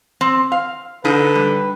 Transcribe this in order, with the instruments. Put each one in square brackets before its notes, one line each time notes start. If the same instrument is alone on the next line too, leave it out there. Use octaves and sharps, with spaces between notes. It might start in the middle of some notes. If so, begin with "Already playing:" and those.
[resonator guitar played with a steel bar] C4
F5
[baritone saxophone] D3 [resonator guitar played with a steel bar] D#4 [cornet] B4
[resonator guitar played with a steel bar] G3